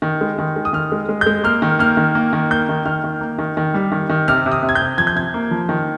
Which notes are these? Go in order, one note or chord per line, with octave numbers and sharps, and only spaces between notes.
D#3
G#3
D#3
G#3
D#6
D#3 F6
G#3
G#3
G6
G#3
A#3 F6
D#3
A#3 F6
D#3
A#3
D#3
A#3 G6
D#3
D#3 F6
D#3
A#3
D#3
D#3
G3
D#3
D#3
C3 F6
C3
D#6
C3
G#6
G6
C3
F3 G#6
G6
C3 G#6
A#3
F3
D#3